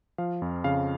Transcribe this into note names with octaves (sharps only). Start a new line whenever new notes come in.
F3 F5
F2
C#3 F5